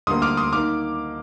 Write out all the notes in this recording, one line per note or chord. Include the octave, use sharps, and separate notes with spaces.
D2 D3 G3 A#3 C6 D#6
D6 F6
C6 D#6
D#3 A#3 D6 F6